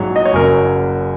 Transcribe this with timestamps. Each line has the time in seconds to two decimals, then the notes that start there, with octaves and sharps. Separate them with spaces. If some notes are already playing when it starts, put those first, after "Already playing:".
Already playing: A#1 G#2 F#3 C#5
0.16 D#5
0.25 C#5
0.33 F#1 F#2 C#3 F#3 A#4